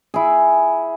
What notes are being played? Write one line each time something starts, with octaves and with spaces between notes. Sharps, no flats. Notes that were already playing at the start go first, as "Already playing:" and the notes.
E4 G#4